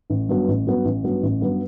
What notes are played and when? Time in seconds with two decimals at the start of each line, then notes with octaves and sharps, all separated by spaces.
0.10 A1
0.29 G2 F#3 B3
0.48 A1
0.66 G2 F#3 B3
0.85 A1
1.04 G2 F#3 B3
1.23 A1
1.41 G2 F#3 B3